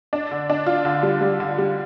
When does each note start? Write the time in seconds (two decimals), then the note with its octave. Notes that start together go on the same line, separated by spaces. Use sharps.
0.13 D4
0.31 D3
0.50 D4
0.66 F4
0.85 D3
1.03 G3
1.21 G3
1.40 D3
1.58 G3